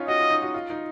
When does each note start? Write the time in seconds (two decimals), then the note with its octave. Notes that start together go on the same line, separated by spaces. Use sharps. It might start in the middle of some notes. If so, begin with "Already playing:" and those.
Already playing: C#4 D#4 F4
0.08 F#4 D#5
0.20 F4
0.30 D#4
0.42 F#4
0.54 F4
0.70 D#4